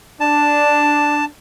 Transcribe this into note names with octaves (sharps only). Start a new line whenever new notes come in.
D4 A5